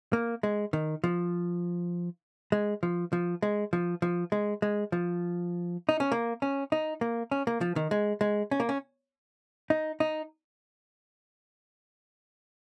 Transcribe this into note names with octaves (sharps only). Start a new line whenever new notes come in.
A#3
G#3
D#3
F3
G#3
F3
F3
G#3
F3
F3
G#3
G#3
F3
D#4
C#4
A#3
C#4
D#4
A#3
C#4
A#3
F3
D#3
G#3
G#3
C#4
A#3
C#4
D#4
D#4